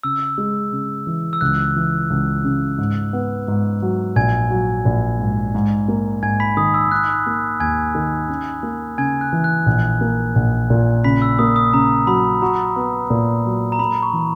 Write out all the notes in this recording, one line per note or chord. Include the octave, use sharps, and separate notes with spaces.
C#3 E6
G#3
C#3
E3
E6
C#2 F#6
E3
C#2
C#3
G#2
B3
G#2
F#3
A#1 G#5 G#6
F#3
A#1
G#2
G#2
A#3
G#2 G#5 G#6
B5 B6
D#3 D#6
E6
D#4 F#6
A#3
D#2 G#5 G#6
D#3
C#4
A#3
C#3 G#5 G#6
F#6
E3
F#6
A#1
A#3
A#1
A#2
C#3 B5 B6
E6
A#3 D#6
D#6
C#3 A#5
F#3 B5
F#4 A#5
B3
A#2
F#3
A#5
A#3 B5
C#6
E3